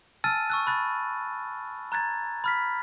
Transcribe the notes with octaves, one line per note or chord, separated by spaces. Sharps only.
G#5 A5 E6 F6 A6 D#7
C#6 E6 F#6
B5 F#6 A6
A#5 F#6 G#6 A6
B5 F6 B6